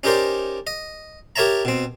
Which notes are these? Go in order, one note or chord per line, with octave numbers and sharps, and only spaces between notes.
C#4 D#4 G4 A#4 C5 D5
D#5
G4 A#4 C#5 E5 A5 A#5
B2 C4